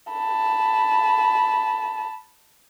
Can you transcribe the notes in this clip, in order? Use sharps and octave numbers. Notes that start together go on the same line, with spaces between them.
A5 B5